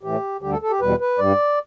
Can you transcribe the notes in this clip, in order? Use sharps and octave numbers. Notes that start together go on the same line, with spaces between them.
A2 E3 A3 G4
D2 D3 G3 G4
A4
A4
G4
E2 B2 G3 B4
B4
G2 G3 D5